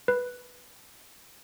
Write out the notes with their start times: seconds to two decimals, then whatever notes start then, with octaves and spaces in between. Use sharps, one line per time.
0.08 B4